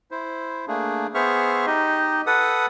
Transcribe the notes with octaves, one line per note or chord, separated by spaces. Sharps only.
E4 C5
A3 A#3 D4 G#4
B3 G#4 C5 E5 C#6 F6
D#4 G4 D#5
A4 B4 F#5 D#6